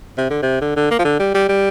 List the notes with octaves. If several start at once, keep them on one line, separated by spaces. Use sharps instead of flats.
C3
D3
C3
D3
D3
A#3
F3
D3
G3
G3
G3